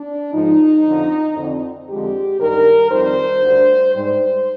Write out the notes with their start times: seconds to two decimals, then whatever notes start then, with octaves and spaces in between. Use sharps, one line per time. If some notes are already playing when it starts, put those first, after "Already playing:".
Already playing: D4
0.33 G#2 F3 G#3 D#4
0.86 F2 D3 F3
1.37 F2 D3 F3
1.88 F2 D3 G#3 G4
2.40 G2 D#3 G3 A#4
2.91 F2 D#3 G3 C5
3.43 D2 D3 G3
3.93 G#2 G3 C5